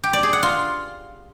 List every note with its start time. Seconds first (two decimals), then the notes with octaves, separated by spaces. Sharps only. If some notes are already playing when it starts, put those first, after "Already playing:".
0.04 G4
0.13 D5
0.23 G#4
0.33 F#5
0.43 F4